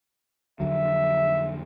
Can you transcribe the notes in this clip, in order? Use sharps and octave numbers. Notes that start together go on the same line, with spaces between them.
F2 D3 F#3 E5